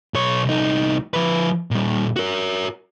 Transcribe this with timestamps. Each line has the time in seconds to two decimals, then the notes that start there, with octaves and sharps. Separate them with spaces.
0.14 B1 C#5
0.45 C2 D#4
1.14 F3 B4
1.71 A#2 G3
2.16 F#4 A#4